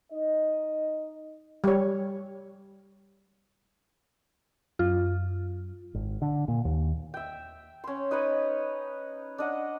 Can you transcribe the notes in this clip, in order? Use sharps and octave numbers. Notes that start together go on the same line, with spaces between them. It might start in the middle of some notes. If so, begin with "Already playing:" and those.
D#4 D#5
G3 C#5
F#2 F4
G#1
D3
A#2
D#2
E5 G5
C#4 C6
D#4 B4 C#5 D#5
D4 D#5 F#5